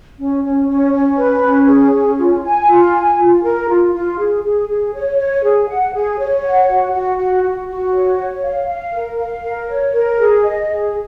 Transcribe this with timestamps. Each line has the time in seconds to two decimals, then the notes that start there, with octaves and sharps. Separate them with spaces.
0.17 C#4
0.43 C#4
0.68 C#4
0.93 C#4
1.17 B4
1.43 C#4
1.68 G#4
1.92 C#4
2.17 F4
2.43 G#5
2.67 F4
2.93 G#5
3.17 F4
3.43 A#4
3.68 F4
3.93 F4
4.17 G#4
4.43 G#4
4.68 G#4
4.93 C#5
5.17 C#5
5.43 G#4
5.69 F#5
5.94 G#4
6.19 C#5
6.43 F#5
6.69 F#4
6.92 F#4
7.17 F#4
7.43 F#4
7.68 F#4
7.93 C#5
8.19 C#5
8.43 F5
8.67 F5
8.93 A#4
9.19 F5
9.43 A#4
9.68 C#5
9.93 A#4
10.18 G#4
10.43 D#5
10.68 G#4